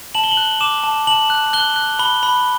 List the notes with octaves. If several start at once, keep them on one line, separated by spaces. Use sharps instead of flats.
A5 F#7
G7
F#7
F#6
D6 E7
A5
A5 F#7
F#6
F#6 G7
F#6
B5 G7
B5